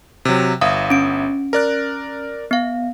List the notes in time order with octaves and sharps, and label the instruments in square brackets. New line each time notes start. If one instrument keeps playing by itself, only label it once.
[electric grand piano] C3 F#3
[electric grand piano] G1 E5 D#6 [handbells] F5
[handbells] C#4 D7
[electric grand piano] A#4 D5 F#6
[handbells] B3 F5